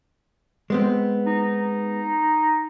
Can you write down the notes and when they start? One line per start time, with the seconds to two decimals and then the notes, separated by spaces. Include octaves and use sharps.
0.70 G#3 B3 C4
1.27 D#4